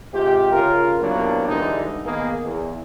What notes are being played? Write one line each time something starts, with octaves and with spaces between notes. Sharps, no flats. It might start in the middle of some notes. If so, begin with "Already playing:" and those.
G#2 C3 F4 G4
C#3 F4 A#4
C2 C3 F#3 A#3 B3 D4
G2 D3 E3 G#3 D#4
D#3 A#3 B3 G#4
E2